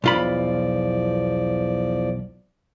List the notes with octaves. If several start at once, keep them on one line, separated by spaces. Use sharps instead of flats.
B1 E2 F3 F4 D5 B5